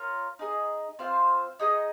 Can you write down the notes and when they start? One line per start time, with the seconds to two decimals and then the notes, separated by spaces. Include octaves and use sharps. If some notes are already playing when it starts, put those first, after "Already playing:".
Already playing: F4 A#4 C#5
0.39 D#4 G#4 D#5
0.99 C4 F4 C5 F5
1.59 D#4 G#4 D#5